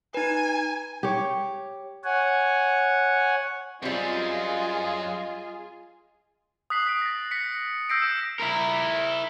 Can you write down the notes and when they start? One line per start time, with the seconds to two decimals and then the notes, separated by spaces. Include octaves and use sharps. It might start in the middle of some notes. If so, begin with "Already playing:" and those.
0.14 D#4 B4 G#5
1.03 G4 C#5
2.04 C#5 F#5 G#5
3.83 F#2 G3 C4 F4 G#4 D#5
6.70 D#6 F#6 B6 C7 F#7
6.87 B6 D7
7.02 A6 A#6
7.31 A#6 B6 C#7
7.89 E6 G6 A#6 C7 D7
8.02 D#6 A#6 E7
8.40 E4 A#4